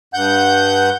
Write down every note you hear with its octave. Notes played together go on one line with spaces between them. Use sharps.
G2 F#5 G6